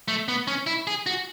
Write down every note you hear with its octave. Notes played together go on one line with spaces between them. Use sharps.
A3
B3
C#4
E4
G#4
F#4